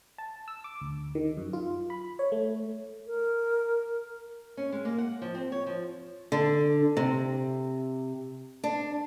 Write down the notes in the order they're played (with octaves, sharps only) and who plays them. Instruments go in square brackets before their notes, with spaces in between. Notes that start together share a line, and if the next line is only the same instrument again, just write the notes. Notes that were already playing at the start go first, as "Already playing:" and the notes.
[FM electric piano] A5
E6
D6
D2
D#3
F#2
F4
B5
C#5
A3
[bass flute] A#4
[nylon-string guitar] C#4
G#3
A#3
F#5
F3
C4
C#5
F3
[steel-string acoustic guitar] D3
C3
D4